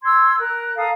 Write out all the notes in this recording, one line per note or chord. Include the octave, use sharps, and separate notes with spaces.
C6 E6 G#6
A#4 F#6
A4 F5 A#5 D#6